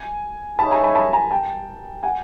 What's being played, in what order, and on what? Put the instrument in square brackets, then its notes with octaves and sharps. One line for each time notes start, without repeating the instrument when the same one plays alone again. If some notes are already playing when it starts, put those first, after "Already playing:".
Already playing: [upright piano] G#5
[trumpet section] D#4 G#4 C#5 E5 [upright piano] A5 B5
[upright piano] G#5 A#5
A5 B5
A5 B5
G#5 A#5
G5 A5
F#5 G#5